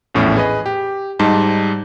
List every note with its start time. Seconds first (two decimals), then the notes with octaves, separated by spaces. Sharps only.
0.14 A#1 E2 A2 C#4
0.37 G#4 B4 D#5
0.66 G4
1.19 G#2 G3 D#4 A5